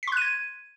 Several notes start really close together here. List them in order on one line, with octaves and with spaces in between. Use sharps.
B6 C6 F#6 D#7 G#6